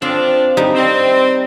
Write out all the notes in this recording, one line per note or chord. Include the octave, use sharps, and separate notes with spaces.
F3 C4 D4
G3 D#4
C4